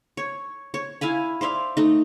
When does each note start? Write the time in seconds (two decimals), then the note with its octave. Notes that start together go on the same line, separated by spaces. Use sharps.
0.17 C#5
0.74 C#5
1.01 E4 F5 G#5 B5
1.41 C5 D5 E5 F5
1.77 A3 D#4